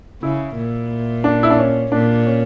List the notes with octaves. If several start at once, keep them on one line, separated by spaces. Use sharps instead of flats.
C#3 E4
A#2
D4
E4
D4
C#4
A#2 D4
C#4